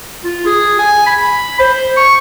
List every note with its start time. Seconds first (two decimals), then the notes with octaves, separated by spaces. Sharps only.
0.24 F4
0.46 G#4
0.79 G#5
1.07 B5
1.59 C5
1.97 C#6